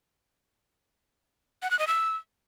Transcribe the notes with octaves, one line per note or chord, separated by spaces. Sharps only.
F#5
F#6
D#5
E6